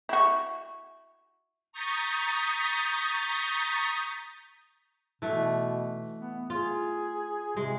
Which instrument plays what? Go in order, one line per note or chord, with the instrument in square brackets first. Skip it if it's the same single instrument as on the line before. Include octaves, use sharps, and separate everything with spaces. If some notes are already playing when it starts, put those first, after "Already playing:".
[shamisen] E4 F#4
[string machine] A#5 C#6 D#6 G6 A6 B6
[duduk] B2 [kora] E3 A3
[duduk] B3
[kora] F4 [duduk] G#4
[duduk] C3 [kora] G#3